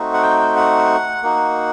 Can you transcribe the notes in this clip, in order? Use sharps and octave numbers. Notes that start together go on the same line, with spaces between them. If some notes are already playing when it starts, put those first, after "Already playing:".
Already playing: A3 C4 D#4 F#4
F#5
G5
G5
F#5
A#3 D#4 F#4